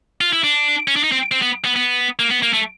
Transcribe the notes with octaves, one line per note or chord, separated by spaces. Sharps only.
F4
E4
D4
C#4
D4
D#4
C4
C4
B3
B3
B3
A#3
B3
A#3
A3